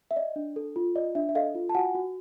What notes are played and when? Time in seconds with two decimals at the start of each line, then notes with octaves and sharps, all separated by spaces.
0.11 E5
0.16 D5 D#5
0.36 D4
0.56 A4
0.76 F4
0.96 D5 D#5
1.15 D4 E5
1.29 E5
1.35 A4 D#5 F5
1.55 F4
1.69 A5
1.75 F#4 F#5 G#5
1.95 F#4